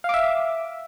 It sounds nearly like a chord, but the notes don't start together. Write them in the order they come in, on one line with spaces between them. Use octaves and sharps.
F5 D6 E5